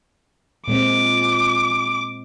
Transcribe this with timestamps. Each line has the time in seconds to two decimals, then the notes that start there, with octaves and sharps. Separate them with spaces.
0.68 A#2 G#3 C4 D6